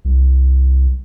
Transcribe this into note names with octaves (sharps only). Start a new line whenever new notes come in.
C2